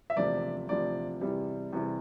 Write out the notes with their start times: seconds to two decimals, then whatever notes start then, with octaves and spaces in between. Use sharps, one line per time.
0.10 E5
0.16 E1 D2 C3 F3 D5
0.69 E1 D2 C3 F3 D5
1.21 E2 C3 G3
1.73 E2 C3 G3